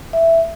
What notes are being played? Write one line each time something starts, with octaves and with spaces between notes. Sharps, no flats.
E5